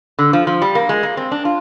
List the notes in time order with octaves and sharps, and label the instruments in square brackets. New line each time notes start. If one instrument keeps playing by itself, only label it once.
[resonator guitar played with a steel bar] D3
F3
F3
G3
A#3
G#3
A#3
C4
D4
F4